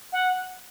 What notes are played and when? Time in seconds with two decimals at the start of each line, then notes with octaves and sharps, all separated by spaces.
0.12 F#5